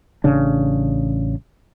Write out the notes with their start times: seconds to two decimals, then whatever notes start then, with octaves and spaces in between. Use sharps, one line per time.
0.24 A1 C#3 D4